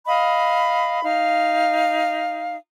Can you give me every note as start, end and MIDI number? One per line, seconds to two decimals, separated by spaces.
0.06 1.02 75
0.06 1.02 77
0.06 1.02 83
1.03 2.55 63
1.03 2.55 77